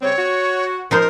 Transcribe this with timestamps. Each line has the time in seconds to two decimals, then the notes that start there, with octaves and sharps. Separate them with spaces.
0.02 C#3 G3 C4 C#5
0.18 F#4
0.91 F3 D#4 A#4 C5